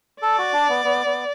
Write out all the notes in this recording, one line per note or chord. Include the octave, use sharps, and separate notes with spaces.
A4 D5
F#4
D4
B3
B3
B3